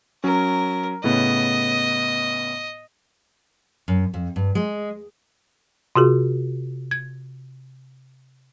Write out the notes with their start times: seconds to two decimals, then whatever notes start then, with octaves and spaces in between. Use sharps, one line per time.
0.24 F#3 C#4 A#4
1.04 A2 C#3 B3 D#5
3.88 F#2
4.14 F2
4.36 G2
4.55 G#3
5.96 C3 F4 F#4 G#4
6.91 G#6